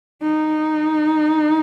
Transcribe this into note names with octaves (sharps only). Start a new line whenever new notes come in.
D#4